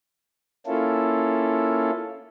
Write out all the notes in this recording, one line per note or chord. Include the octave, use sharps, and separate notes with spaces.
A#3 C#4 E4 F4 A4